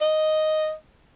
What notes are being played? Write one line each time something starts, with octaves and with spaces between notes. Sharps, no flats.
D#5